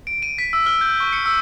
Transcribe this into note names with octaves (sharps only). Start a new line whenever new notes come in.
D7
D#7
B6
E6
F6
G6
C#6
C#7
E6